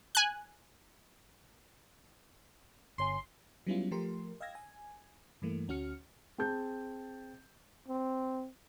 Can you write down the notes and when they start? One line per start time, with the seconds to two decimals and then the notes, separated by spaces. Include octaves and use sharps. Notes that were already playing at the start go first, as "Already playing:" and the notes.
0.15 G#5 F#6
2.98 G1 C#5 G#5 C6
3.67 F#3 G3 B3 C#4 E4 F4
3.91 F3 A3 G4 A#4 C6
4.40 D#5 F5 G5 E6 G#6 A#6
4.55 G#5
5.42 G2 E3 A3 A#3
5.68 D2 C#4 F#4 F6 C#7
6.38 C4 G#4 A5 G6
7.88 C4